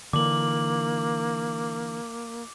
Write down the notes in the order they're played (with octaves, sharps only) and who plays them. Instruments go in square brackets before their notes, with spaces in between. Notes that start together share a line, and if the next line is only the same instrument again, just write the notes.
[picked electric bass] D3 E3 [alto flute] A#3 [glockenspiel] D6 F#7